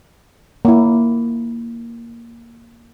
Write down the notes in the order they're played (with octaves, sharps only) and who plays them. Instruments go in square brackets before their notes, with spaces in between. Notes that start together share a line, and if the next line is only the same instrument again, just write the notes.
[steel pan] A#3 E4